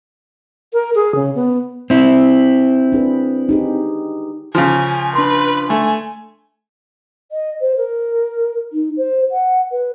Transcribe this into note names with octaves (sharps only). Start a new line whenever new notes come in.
A#4
G#4
C#3
B3
C4 E4
D4 G#4 B4
D#4 G4 G#4
C#3 F3 G#5
D4 B4 C6
A3 G#5
D#5
C5
A#4
D#4
C5
F#5
B4